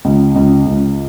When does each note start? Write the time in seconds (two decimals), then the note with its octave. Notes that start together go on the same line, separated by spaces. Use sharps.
0.05 C#2
0.36 C#2
0.67 C#2